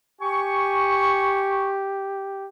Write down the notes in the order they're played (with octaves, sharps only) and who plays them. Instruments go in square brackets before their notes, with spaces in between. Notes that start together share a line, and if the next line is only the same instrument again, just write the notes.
[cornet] G4 [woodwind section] G#5 C#6